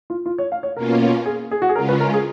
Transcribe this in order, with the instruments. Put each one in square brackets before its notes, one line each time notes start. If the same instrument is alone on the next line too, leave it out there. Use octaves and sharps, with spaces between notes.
[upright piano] F4
F4
C#5
F5
C#5
[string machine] B2 A#3 C#4 F4 [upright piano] A#4
[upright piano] G#4
G#4
F#4
G#4
[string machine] C#3 G#3 C#4 F4 [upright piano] A#4
[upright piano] B4
A#4
G#4